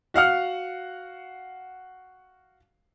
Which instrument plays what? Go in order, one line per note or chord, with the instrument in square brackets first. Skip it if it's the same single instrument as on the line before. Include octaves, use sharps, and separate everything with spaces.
[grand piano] F#4 F5 F#5 F6